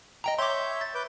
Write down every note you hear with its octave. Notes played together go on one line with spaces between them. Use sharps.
D#5 G5 A#5
C#5 E5 C6 D6 G6
A6
B4 D6 G6